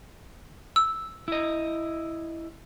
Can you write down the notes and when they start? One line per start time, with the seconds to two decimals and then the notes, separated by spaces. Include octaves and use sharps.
0.76 E6
1.28 E4 D#5